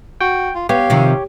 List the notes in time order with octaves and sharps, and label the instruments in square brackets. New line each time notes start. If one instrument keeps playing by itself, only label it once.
[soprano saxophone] F#4 [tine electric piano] G5
[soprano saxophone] F4
[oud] B3 [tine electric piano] G4 C#5 [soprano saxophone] F5
[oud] C3 D#3 F3